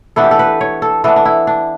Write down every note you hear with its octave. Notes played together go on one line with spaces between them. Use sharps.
E3 B3 D4 A4
G4
A4
B4
C#5
A4
E3 B3 D4 A4
D4
E4
D4